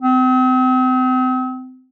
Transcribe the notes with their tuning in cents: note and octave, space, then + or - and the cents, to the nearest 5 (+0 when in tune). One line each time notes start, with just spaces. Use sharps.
C4 -35